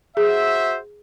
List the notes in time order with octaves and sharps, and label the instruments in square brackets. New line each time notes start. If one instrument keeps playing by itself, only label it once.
[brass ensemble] F#4 C5 E5 [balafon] G#4